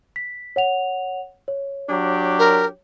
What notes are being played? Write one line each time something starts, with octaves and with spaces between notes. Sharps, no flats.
B6
C#5 F#5 F7
C#5
F#3 D4 G4
A#4